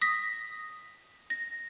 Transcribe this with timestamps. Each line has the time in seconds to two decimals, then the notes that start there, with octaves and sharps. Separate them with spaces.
0.01 D#6 A#6 B6
1.30 A#6